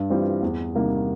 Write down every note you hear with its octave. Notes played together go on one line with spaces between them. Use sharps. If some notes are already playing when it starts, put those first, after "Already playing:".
Already playing: G2
E3 G3 C4 F4
E2
C3 D#3 G3 A#3